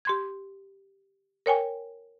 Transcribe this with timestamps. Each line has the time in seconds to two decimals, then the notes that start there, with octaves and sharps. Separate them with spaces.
0.05 G4 C6 G#6
1.46 A#4 C#5 G5 G#5